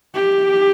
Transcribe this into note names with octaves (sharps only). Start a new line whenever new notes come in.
G4